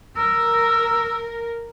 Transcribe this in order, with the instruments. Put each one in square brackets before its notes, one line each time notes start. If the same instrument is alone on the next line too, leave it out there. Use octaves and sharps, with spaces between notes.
[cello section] A#4 [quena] E6